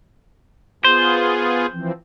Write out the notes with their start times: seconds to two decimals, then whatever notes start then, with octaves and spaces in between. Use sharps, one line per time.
0.84 B3 F4 G#4 C5
1.72 E3 F3 C4